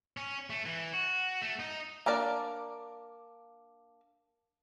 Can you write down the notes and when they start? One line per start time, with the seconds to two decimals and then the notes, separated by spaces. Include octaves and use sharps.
0.17 C#4
0.50 A3
0.66 E3
0.93 F#4
1.41 A3
1.59 D#4
2.06 A#3 D4 A#4 D5